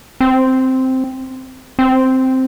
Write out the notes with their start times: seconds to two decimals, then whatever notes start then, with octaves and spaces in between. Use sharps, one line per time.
0.21 C4
1.79 C4